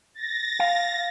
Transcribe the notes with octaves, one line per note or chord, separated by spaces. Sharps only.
A6 A#6
F5